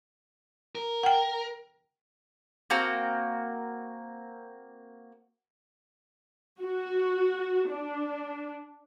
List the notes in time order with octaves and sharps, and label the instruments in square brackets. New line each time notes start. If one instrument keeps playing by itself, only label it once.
[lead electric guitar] A#4
[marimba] F#5 G5
[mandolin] A#3 C4 F#4 A#5
[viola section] F#4
D4